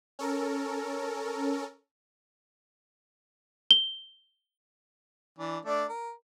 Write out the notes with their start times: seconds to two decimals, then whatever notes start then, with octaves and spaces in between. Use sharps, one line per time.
0.19 C#4 A4 A#4
3.71 G7
5.39 E3 D4
5.65 A3 D4 D5
5.89 A#4